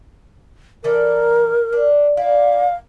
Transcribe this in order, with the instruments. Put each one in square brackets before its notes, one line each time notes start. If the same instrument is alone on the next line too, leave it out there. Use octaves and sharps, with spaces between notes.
[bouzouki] E3 A4 D5 [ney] A#4
[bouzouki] D4
[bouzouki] E4 D5 [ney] F5